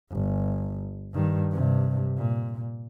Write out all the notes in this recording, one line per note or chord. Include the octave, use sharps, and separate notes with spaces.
G1
G2 D#3
G2 C3
A#2